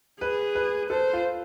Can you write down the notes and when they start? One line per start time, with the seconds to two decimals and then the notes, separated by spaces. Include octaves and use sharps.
0.21 G#4 B4
0.55 B4
0.90 A4 C5
1.13 F4